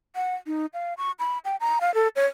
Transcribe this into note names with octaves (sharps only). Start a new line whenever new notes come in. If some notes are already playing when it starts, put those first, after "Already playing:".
F#5
D#4
F5
C#6
B5
G5
A#5
F5
A4
C#5